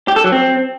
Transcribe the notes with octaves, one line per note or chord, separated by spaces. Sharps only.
G4
A4
F#3
C4